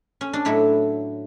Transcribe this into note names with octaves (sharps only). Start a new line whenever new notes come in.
C#4
D4
A2 F#3 A3 E4